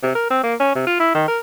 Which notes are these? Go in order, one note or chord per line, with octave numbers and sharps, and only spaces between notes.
C3
A#4
C4
A#3
C#4
C3
F4
E4
D#3
A#4